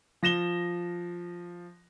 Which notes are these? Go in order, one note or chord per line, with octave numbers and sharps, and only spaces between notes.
F3 A#6 E7 G7